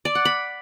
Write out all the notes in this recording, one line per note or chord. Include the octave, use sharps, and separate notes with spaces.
D5
F#5
B5